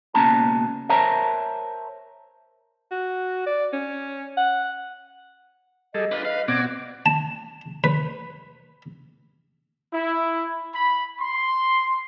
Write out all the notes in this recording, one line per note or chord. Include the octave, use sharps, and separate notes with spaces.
C#2 B2 A#3 C#4 A5 A#5
A#4 C5 C#5 E5 A5 A#5
F#4
D5
C#4
F#5
G3 G#4 A4 D#5
D4 F4 B4
D#5 F5
B2 C4 F#4 D5 D6 G#6
A5
B4
E4
B5
C6